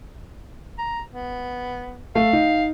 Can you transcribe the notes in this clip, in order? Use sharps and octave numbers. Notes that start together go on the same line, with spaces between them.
A#5
B3
A3 F5
D#4